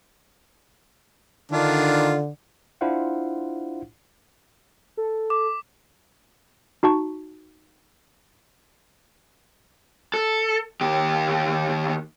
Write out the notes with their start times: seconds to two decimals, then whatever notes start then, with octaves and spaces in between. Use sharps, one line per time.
1.51 D3 D#3 D4 F4
2.81 D4 E4 F4 C5 F5 F#5
4.97 A4
5.30 D6
6.83 D#4 F#4 A5 C#6
10.14 A4
10.81 D#2 G4